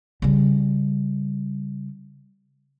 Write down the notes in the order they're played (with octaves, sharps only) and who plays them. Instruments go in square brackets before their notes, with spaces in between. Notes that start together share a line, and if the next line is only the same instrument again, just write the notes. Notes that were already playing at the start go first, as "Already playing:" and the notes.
[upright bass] C#3 G3